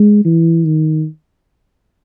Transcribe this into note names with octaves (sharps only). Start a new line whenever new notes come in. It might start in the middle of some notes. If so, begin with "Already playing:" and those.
Already playing: G#3
E3
D#3